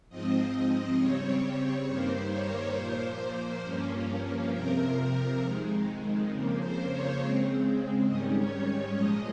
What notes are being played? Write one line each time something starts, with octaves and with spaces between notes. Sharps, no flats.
G#2 F3 C4 D#5
C#3 G3 C4 C#5
G2 D#3 G3 A#3 C5
C#5
A#2 F3 A#3 C5
G2 F3 A#3 C#4
F2 C3 F3 A#4
F2 D#3 G#3
F2 C#3 F3 A#3
C5
C#5
C#3 G#3 C4
G#2 D#3 G3 C#4 D#5
C#5
C#5
A#2 F3 G#3 D#5